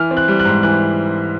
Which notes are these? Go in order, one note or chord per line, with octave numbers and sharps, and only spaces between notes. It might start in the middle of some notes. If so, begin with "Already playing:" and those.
Already playing: E3 F6
C4
F#6
G3
F#6
G#2
E3 F#6